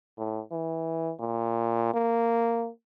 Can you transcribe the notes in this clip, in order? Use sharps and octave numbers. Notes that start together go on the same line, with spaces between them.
A2
E3
A#2
A#3